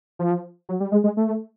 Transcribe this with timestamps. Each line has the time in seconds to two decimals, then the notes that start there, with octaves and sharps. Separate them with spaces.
0.19 F3
0.69 F#3
0.80 G3
0.92 G#3
1.04 G#3
1.17 A3